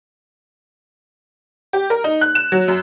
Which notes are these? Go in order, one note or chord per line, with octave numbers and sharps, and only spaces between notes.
G4
A#4
D#4
F#6
E7
F#3
F#2